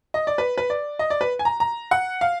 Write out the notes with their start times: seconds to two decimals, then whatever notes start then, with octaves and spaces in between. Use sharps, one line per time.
0.14 D#5
0.27 D5
0.38 B4
0.58 B4
0.70 D5
0.99 D#5
1.10 D5
1.21 B4
1.39 G#5
1.45 A#5
1.60 A#5
1.91 F#5
2.21 F5